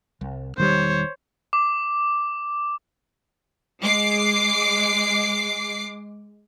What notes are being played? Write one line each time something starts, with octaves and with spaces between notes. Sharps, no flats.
C2
E1 D#3 G3 C5 C#5
D6
G#3 D6 C7